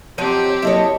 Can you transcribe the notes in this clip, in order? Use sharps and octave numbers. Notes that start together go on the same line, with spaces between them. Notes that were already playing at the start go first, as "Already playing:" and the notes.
F3 F#3 C4 D#4 G4
F#3 A#3 E4 A4 C#5 D#5